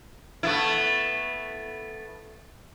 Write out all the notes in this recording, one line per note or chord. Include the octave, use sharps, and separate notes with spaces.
A3 B3 E4